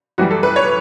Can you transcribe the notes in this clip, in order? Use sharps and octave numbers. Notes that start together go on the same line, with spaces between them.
F#2 E3 G3 F#4
A4
B4
C#5